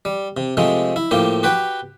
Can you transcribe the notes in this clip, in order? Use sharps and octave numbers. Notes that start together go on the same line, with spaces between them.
G3
C3
C3 F3 G#3 A3
E4
A2 F3 A#3 G4
F#4 G4 B4 G5